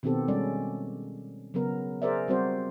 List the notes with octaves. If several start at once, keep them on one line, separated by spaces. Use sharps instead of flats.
B2 D#3 B3 C4 G4 A4
G3 G#3 C#4 A4 D5
C#3 F#3 B3 A#4
G#4 A#4 C5 D5 E5
G3 C4 F#4 C5 D5